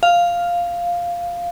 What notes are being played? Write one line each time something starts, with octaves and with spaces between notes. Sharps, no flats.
F5